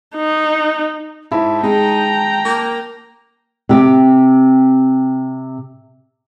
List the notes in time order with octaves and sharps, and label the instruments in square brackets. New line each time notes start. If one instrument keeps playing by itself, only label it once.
[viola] D#4
[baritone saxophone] G#2 [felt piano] E4 [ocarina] A5
[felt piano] G#3 [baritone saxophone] D#4 [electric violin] G5 A#5
[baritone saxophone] A#3
[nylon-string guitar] C3 G4